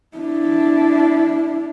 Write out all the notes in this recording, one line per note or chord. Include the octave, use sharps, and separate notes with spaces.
D4 E4